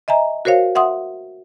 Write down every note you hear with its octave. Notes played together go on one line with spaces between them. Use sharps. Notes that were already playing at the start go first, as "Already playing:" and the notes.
D#5 E5 G#5 A#5
F#4 A#4 C5 C#5 F5
E5 F#5 C6 D#6